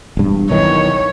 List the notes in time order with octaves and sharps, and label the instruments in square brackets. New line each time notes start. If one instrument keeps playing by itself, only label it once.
[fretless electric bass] E1 G2
[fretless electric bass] B1 D#3 E3 [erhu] C#5